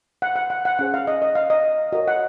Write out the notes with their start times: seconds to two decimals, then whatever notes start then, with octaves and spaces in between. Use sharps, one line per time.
0.22 F#5
0.36 F#5
0.50 F#5
0.65 F#5
0.79 C#4 G#4 C5 F#5
0.94 F5
1.07 D#5
1.22 D#5
1.35 F5
1.50 D#5
1.92 F#4 A#4 C#5 D#5
2.08 F#5